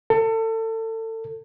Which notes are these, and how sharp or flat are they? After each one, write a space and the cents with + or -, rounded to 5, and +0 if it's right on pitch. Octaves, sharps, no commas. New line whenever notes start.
A4 +30